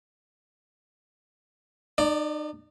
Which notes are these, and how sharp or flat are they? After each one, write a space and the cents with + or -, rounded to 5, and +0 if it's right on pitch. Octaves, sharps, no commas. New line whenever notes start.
D#4 -40 D5 +0